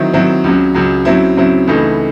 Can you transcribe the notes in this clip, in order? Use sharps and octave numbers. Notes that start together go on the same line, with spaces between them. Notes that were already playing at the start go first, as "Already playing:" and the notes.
Already playing: D#3 F#3 C4 E4
D#3 F#3 C4 E4
C#2 C#3 F#3
C#2 C#3 F#3
C#3 F#3 C4 E4
C#3 F#3 C4 E4
C#2 C#3 E3 A3 D#4